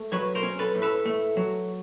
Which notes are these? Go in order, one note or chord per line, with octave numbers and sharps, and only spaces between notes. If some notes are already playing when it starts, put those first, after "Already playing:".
Already playing: A3
F#3 B4 C#5
A#4 C5
C#4
A4 B4
A2
A4 B4
A3
F#3